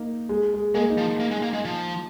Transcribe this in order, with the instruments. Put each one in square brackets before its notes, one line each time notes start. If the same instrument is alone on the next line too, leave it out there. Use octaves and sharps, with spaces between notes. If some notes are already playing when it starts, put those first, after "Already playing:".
Already playing: [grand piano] A#3 D#4
G#3
G#3
[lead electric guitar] G#3 [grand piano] A#3
[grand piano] D#4
[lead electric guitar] F3
A#3
G#3
A#3
G#3
F3